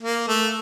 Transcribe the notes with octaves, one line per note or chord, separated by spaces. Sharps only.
A#3
A3